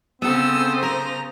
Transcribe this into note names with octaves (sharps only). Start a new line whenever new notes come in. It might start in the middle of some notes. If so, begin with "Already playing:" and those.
C#3 B3 C4 A4 C5 D#6 E6
A#4 A#5